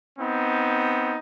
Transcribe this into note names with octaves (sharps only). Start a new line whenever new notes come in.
B3 C4 D#4